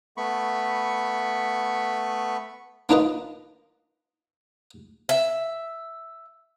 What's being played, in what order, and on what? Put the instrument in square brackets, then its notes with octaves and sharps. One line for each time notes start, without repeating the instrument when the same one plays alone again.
[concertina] A3 B3 B5 C#6
[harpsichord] A#3 D4 D#4 F4 B4 D#5
[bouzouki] E5